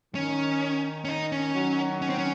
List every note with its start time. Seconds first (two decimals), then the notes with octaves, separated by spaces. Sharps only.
0.15 D#3 C#4
1.05 C#4
1.09 D#4
1.32 C#4
1.55 D#3 F#3
2.02 C#4
2.10 C4
2.18 C#4